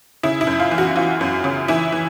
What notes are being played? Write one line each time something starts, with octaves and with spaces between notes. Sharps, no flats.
C#3 E4
E4
F#2
F4
E3
F#4
E3 F4
F#2
C#3
E3 E4
E3